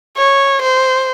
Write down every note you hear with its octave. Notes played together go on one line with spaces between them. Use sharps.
C#5
C5